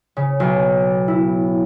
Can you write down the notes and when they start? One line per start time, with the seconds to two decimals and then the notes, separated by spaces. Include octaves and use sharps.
0.17 C#3
0.40 B1
1.08 E4